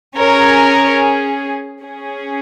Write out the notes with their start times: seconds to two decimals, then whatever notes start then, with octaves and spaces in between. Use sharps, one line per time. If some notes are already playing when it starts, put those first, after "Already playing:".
0.18 C#4 G#4 A#4 C#5
1.84 C#4 G#4